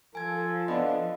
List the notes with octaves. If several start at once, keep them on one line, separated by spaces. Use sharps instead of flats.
F3 A4 G#5 G#6
B3 D4 F4 D#5